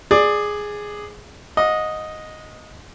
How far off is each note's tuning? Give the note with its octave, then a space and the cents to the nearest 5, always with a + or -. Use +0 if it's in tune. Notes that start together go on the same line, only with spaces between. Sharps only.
G#4 +0 D5 +15
D#5 +0 F#5 -35